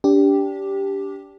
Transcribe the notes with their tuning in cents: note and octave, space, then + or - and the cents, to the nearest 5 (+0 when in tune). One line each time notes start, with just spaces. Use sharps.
D4 -30 G4 +0